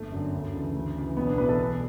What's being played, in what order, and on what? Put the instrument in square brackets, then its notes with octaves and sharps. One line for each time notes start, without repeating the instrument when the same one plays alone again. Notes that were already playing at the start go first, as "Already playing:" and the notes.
Already playing: [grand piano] G1 A3
F#2 D3
D2
C#3 E3
D2
C#3 E3
B1 B3
D4
A2 E3 B4
A4
B1